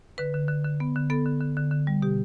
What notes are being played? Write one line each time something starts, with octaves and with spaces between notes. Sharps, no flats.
D3 B4
D3
D3
D3
B3
D3
B3 A4
D3
D3
D3
D3
G3
B2 G4